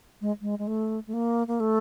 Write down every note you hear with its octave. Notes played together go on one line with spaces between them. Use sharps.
G#3
G#3
G#3
A3
A3
A#3
A#3
A3